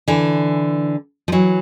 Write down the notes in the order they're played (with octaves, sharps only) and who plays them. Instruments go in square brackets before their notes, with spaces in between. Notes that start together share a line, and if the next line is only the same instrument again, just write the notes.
[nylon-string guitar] D3 E3
F3
E3 F#3